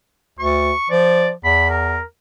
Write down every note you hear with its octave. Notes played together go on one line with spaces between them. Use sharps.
D2 C#6
F3 D5
E2 B5
A#4